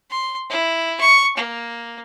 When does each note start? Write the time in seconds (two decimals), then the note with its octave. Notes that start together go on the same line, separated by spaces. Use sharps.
0.11 C6
0.50 E4
1.00 C#6
1.37 A#3